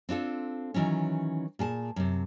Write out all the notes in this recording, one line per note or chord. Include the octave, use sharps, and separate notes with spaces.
C4 D4 F4 A4
D#3 E3 F#3 C#4
A#2 G#4 G#5 A5
F#2 C3